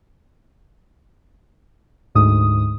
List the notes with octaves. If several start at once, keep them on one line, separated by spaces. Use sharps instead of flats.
D2 G#2 D#6